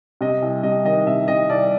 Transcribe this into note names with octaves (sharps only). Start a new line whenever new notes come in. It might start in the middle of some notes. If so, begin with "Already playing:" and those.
C3 D#5
C2
C3 D#5
D#3 D#5
C3 E5
C3 D#5
C2 D5